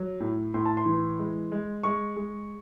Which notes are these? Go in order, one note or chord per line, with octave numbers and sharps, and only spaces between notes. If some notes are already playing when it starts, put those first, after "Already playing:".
Already playing: F#3
A2
A2 C6
A5
C6
E3
G#3
G#3
G#3 C#6
G#3